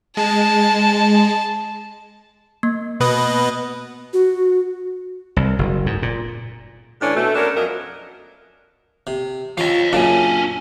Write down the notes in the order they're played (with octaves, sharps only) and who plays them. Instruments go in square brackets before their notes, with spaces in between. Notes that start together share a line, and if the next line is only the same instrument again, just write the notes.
[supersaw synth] G#3 [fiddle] A5
[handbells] A#3
[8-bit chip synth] B2 B4 D#5
[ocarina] F#4
[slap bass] C2
F#1
G#2
A#2
[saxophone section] A2 E3 C#4 D4
B2 A3
B3 C#4 D4 A#4
F2 F#3 A#4 D#5
[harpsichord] C3
[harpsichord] F3 C#4 [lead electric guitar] D#5 F5
[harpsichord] F#2 A#2 C#3 [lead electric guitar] C#4 D4